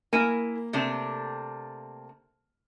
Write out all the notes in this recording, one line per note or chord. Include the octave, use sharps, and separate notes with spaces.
A#3 E4 A#4 G#5
C3 A3 D4